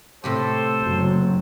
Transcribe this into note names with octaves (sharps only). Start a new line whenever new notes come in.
A2 C3 G4 A4 C5
F#1 F#3